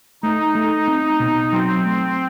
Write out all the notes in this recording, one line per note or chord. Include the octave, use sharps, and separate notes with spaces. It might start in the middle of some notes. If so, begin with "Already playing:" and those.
A3 D#4
A3
C4
B2
F#3 C4
A3